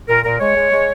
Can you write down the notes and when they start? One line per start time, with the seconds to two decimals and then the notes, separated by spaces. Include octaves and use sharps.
0.08 A#2 A#4
0.24 A#2 A#4
0.39 G#3 C#5
0.55 G#3
0.71 G#3